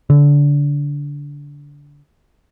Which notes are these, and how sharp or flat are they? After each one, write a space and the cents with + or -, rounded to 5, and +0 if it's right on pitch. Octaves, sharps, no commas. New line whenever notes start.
D3 -25